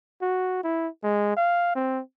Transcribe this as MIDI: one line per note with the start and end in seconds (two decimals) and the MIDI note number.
0.22 0.62 66
0.64 0.88 64
1.03 1.32 56
1.37 1.75 77
1.76 2.00 60